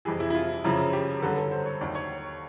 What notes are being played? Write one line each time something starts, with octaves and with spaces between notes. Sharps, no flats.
F2 C3 E3 G#4
E4
E4
F4
F#2 C#3 F3 E4
G4
G2 D3 F#3 A4
A4
C5
C#5
D#2 D#3 F#3 D5
C#5